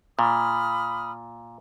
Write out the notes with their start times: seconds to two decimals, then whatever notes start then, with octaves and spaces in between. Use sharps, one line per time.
0.19 A#2 B5 D#6 F6